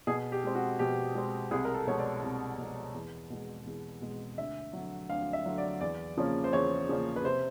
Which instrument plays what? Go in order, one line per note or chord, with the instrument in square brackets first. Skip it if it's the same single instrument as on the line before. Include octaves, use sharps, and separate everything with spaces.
[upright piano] B2 G#4
G4
G#3 C4
F#4
B2 G4
G#3 C4
C2 G#4
A#4
A4
B2 G#3 C#5
D5
C2
B2 G#3
E2
B2 G#3
E2
B2 G#3
D2 E5
D3 F#3
D2 F5
E5
D3 F#3
D5
E2 D5
C#3 F3 A#3 C#4
C5
E2 C#5
C#3 F3 A#3 C#4
B4
C3 C5